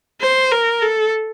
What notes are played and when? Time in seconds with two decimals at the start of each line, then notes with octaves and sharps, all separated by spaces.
0.21 C5
0.51 A#4
0.82 A4